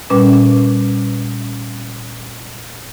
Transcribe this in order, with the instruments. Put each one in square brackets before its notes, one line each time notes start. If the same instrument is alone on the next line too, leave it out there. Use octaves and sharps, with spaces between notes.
[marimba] A#2 G3 C#4 B4 D6